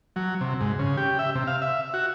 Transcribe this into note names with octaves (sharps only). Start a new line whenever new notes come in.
F#3
C3
G#2
C#3
G4
E5
C3
F5
E5
F#4